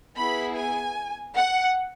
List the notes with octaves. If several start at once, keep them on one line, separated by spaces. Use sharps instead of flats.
B3 E4 G#4 B5
G#5
F#5